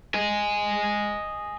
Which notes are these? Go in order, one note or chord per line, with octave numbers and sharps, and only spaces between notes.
D#5 G#5